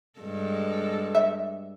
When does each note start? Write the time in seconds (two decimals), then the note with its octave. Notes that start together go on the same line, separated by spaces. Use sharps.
0.20 G2 G#3 A4
1.15 E5